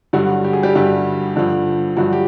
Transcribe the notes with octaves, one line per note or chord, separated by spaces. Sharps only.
G2 D3 F#3 G3 F#4
G4
G#4
G3 G4
G2 D3 G3
G2 D3 F3
G2 D3 F3 F#3 F#4
G4